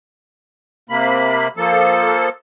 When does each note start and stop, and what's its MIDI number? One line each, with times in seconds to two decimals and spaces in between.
0.90 1.48 48
0.90 1.48 58
0.90 1.48 83
1.57 2.29 53
1.57 2.29 58
1.57 2.29 69